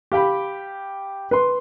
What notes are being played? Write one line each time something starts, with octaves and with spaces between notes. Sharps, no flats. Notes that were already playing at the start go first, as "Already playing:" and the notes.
G4 F5 G5 B5
B4 C6